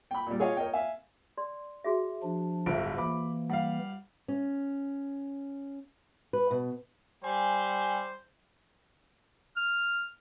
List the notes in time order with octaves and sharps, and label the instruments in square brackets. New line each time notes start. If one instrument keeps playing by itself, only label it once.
[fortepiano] G5 B5
A#2 G3
F4 G#4 C#5 D#5 F5
A#4 C#5 D#5 G5
E5 F5 G#5
[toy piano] D5 C6
F#4 G#4 E5
[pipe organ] F3 D4
[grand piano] D1 G1 D7 [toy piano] F4 C5 E5
[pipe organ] E3 A#3 [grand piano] B5 D6
[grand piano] G3 F5 [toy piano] F#5
[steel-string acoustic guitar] C#4
B4
B2
[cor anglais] G3 [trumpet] C5 [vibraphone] G#5
[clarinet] F6